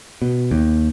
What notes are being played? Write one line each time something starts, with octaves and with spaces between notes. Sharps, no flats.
B2
D#2